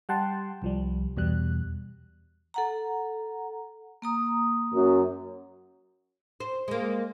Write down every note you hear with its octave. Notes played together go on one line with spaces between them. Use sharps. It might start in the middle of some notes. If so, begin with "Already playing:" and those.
G3 F#5 G5 A5 C6
C2 F3 G3
E2 B2 G3 F#6
A4 F#5 A#5
A#3 A#5 D#6
F#2
C5
G#3 A#3